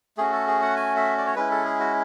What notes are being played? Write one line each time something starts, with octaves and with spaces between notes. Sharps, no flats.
A3 C#4 F#4 G#4
A4
G#4
F#5
G#5
E5
D5
C#5
G#3 C#4 E4 B4
A4
G#4
F#4